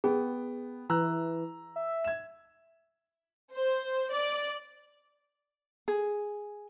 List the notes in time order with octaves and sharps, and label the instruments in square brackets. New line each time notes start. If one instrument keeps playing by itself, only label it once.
[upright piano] B3 G5 [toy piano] G#4
[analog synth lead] E3 [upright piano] A#5 E6 F#6
[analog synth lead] E5
[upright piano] G#6 E7
[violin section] C5
D5
[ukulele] G#4